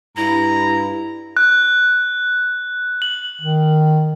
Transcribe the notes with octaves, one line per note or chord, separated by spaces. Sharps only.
G2 E4 A#5
F#6
F#7
D#3